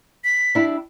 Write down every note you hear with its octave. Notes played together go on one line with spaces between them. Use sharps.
B6
D4 E4 G4